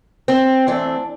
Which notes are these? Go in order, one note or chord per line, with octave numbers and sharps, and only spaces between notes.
C4
E3 A3 C4 D4